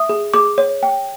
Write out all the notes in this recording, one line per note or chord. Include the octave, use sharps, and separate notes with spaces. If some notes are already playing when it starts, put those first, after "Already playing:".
Already playing: E5 D#6
G#4
G#4 D6
C#5
G5